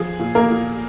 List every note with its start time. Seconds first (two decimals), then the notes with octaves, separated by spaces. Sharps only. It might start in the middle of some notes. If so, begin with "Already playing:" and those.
Already playing: F3 G#4
0.19 A#2
0.35 A#3 A#4
0.50 A#2